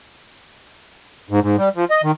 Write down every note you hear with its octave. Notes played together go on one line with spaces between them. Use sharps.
G#2
G#2
G3
F3
D#5
D#3